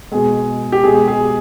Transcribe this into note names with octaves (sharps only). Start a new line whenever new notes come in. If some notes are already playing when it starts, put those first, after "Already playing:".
B2 G#3 G#4
G4
B2 G#3 G#4
G#4